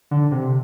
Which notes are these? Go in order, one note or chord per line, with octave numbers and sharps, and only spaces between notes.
D3
C3